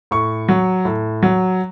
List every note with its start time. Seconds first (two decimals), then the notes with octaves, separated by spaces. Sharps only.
0.11 A2 C#6
0.48 F#3
0.85 A2
1.23 F#3